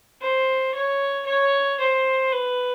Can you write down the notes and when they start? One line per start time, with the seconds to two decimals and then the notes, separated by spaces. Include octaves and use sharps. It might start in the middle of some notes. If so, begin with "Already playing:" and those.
0.22 C5
0.75 C#5
1.27 C#5
1.80 C5
2.33 B4